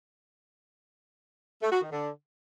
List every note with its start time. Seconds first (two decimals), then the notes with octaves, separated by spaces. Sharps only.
1.62 A3
1.72 F#4
1.82 D#3
1.92 D3